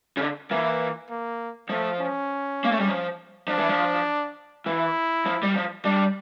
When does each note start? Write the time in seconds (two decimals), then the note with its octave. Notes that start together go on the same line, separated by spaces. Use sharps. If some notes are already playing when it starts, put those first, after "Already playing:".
0.17 C#3
0.22 D3
0.51 E3 A#3
1.10 A#3
1.69 F3 A3
2.00 C#4
2.64 A#3
2.72 A3
2.80 G3
2.88 F3
3.48 F3 D4
3.59 E3
3.69 F3
4.66 E3 E4
5.26 F3
5.43 G3
5.55 F3
5.85 G3 D4